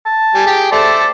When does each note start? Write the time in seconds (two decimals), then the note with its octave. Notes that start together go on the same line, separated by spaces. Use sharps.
0.06 A5
0.35 G3 G#5
0.46 G4 G#4 G5
0.72 A3 A4 C5 D5